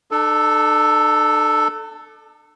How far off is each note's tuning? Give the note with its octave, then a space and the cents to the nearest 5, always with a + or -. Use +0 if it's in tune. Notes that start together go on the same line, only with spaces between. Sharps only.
D4 +45 A4 +0